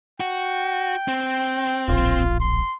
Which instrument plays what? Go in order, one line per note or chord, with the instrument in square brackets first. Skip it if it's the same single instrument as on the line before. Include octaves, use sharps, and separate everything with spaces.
[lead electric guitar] F#4 [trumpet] G5
[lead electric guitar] C4
[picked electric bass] D1 A#1 [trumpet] F4
[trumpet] C6